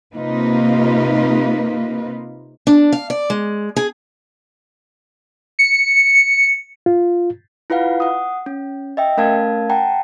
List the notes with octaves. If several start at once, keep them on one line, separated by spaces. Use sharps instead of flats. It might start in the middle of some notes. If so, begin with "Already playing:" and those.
C3 A#3 D#4 F4 B4
D4
F5
D5
G#3
G#4
C#7
F4
E4 F4 B4 F5 F#5
F#5 D#6
C#4
D#5 E5 G5
A3 C#4 A#4 F5 A5 G#6
F#5 G5 A5 A#5